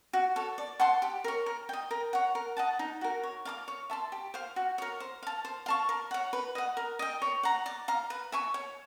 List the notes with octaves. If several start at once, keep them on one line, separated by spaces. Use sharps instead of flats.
F#4
A4 C#5
D5
F#5 A5 C6
G4
A#4 C#5
A#4
D#5 G5
A#4
C#5 F#5
A#4
D#5 F#5 A5
D#4
F#4 A#4
C#5
F5 A5 D6
C#5
E5 A5 C6
G4
C5 F5
F#4
A#4 C#5
C5
F5 A5
C5
F5 A5 C#6
A#4
C#5 F#5
B4
D#5 F#5
A#4
D#5 G5
C#5
F#5 A#5
D5
F5 A#5
B4
E5 G#5 C#6
C#5